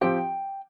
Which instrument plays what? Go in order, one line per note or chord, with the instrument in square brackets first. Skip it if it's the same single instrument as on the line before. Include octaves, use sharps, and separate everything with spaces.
[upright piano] F3 C4 G4 [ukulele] G5